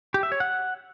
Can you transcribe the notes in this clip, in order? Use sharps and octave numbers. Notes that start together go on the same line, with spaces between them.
G4
E5
C#5
F#5